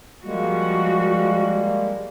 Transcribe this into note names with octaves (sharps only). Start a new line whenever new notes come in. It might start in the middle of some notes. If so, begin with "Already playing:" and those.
F3 G3 G#3 A#3 F#4